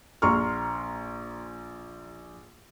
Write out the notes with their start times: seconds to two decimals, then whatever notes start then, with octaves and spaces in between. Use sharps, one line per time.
0.22 A#1 A#5 C6 C#6 F6